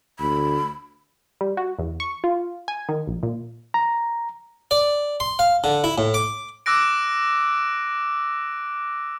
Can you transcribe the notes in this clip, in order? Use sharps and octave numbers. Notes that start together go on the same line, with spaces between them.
D2 B5
G3
F#4
E2
C#6
F4
G#5
D#3
A#1
A#2
A#5
D5
C6
F5
D3
E4
A2
D6
D6 E6 F#6 A#6 D7